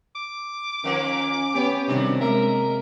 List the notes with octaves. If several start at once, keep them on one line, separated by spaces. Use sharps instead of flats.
D6
D#3 F3 A#3 C#4
B3 G4 C#5
C3 D#3 G3 D4 D#4 F#4
G#3 A#3 A#4 E5